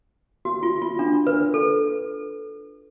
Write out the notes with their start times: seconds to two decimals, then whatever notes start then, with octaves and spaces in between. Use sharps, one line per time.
0.45 F#4
0.63 F4
0.82 F4
0.99 D4
1.27 B4
1.54 A4